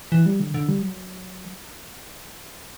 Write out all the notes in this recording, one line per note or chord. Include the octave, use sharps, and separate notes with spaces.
E3
G3
D3
D3
G3
F#3